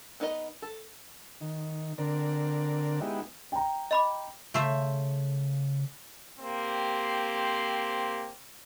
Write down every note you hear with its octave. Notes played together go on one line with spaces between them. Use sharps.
B3 D#4 B4 C#5 D#5
A4
D#3
D3 C4 A#4 D5
G#3 B3 D#4 E4 G4
G5 A#5
D#5 B5 D6
C#3 A3 C5 E5
A#3 C4 G4 C5